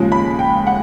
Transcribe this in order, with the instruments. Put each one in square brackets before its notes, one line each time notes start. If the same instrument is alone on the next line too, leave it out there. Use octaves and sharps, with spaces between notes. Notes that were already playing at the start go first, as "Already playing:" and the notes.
Already playing: [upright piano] D#2 C#3 F3 G#3
B5
G5
F#5